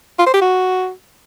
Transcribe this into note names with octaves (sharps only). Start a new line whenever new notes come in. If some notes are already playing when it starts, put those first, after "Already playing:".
F4
C5
G4
F#4